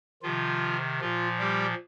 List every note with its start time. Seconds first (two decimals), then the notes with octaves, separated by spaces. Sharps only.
0.23 C3 D#3 F3 F4
1.00 A#2 F3 F4
1.39 G3 G4